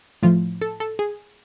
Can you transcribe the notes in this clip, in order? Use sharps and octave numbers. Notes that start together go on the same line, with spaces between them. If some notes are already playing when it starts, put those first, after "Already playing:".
A2 F3 F4
A4
A4
G#4